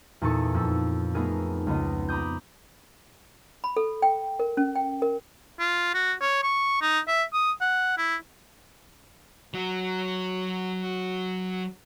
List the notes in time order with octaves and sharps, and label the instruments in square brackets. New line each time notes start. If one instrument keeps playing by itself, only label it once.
[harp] E2 A#2 D#4 A4 C#6 G#6
F2 E6
A3 B3 D#4 G#4 A#4
C#2 B3 D#5
A#5 B5 D6 D#6 G6
[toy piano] B5
A4
G5
A#4
C#4
G5
A#4
[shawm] F4
F#4
C#5
C#6
D#4
E5
D#6
F#5
E4
[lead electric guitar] F#3 F#4